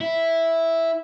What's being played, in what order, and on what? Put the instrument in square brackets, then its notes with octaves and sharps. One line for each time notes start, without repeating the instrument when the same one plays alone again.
[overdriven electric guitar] E4